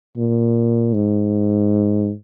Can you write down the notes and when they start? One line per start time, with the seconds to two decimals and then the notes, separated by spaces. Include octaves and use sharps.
0.17 A#2
0.93 G#2